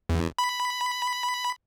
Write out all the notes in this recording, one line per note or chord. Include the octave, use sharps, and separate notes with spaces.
E2
B5